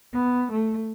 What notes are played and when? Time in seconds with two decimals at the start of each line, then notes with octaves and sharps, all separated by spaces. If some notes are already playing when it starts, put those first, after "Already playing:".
0.13 B3
0.51 A3